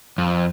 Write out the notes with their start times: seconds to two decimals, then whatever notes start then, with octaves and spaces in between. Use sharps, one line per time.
0.18 F2